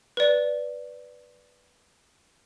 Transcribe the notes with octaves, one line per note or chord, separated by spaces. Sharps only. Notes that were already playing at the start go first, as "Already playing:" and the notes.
B4 D5